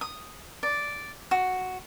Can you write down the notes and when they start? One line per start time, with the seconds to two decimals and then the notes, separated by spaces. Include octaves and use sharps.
0.01 D#6
0.63 D5
1.31 F#4